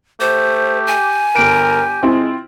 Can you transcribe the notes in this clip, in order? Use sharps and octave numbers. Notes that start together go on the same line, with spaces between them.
A3 G4 C5
G#5
G1 G4 A#4 D7
G#3 C4 E4 F4